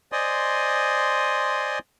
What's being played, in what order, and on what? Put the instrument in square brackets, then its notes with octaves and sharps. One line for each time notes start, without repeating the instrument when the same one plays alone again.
[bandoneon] C5 D5 D#5 G#5 C6 D#6